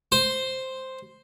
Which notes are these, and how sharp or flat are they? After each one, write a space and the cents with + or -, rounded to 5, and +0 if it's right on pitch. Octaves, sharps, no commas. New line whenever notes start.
C5 +0